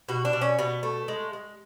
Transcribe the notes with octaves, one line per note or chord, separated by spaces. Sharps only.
B2 F#4
D4
B2
C#4
B2 B3
A3
G#3
G#3